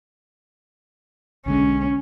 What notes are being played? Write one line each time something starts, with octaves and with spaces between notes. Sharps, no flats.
B1 D3 G#3 C#4